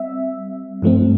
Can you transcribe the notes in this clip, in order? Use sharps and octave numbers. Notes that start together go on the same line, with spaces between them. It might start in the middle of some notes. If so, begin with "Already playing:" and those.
Already playing: G3 C4 E5
G2 F3 A3 C4